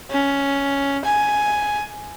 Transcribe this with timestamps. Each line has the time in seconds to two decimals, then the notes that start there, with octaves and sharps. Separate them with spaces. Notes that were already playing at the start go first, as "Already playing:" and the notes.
0.11 C#4
1.05 G#5